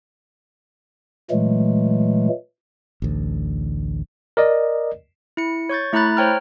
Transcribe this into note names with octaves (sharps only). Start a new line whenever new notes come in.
A#2 E3 F#3 G#3 A3
A1 D2
A#4 D5 D#5
E4 C#7
C#5 C#6 G6 A6
A3 E4 A#5 B5 F#6 A6
C5 C#5 G5 A#5 F6